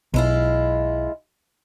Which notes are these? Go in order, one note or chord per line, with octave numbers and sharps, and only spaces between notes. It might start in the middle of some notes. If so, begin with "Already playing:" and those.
B1 G#3 E4 F4